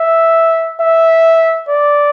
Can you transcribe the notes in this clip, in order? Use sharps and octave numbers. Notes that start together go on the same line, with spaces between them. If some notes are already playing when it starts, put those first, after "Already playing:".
Already playing: E5
E5
D5